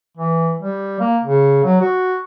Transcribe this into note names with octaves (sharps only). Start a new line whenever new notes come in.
E3
G3
A#3
C#3
F#3
F#4